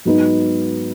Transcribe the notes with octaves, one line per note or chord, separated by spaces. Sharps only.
G#2 F#3 B3 D#4